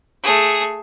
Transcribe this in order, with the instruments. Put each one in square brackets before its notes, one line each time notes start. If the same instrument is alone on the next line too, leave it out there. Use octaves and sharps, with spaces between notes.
[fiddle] A3 G#4